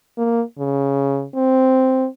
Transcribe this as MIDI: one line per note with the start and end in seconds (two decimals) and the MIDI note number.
0.18 0.43 58
0.59 1.26 49
1.35 2.07 60